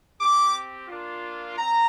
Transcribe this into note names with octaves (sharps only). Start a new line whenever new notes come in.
C4 G4 D6
A#3 D4 F4
C4 A#5